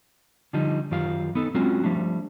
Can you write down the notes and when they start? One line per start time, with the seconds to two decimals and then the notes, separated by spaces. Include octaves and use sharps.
0.53 D3 F3 G3 D#4
0.91 F#2 D#3 F4 G4 F5
1.35 B3 D#4 A4
1.54 F#3 G#3 C4 C#4 F4 F#4
1.84 F3 G3 A3 D4